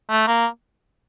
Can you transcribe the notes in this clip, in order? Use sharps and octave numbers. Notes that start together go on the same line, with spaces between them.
A3
A#3